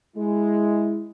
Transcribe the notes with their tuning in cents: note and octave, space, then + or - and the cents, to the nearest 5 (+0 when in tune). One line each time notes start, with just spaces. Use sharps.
G#3 +0 E4 +0